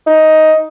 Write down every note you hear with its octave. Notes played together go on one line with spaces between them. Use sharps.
D#4